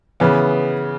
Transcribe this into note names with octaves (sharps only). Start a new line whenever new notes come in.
C#3 E3 B3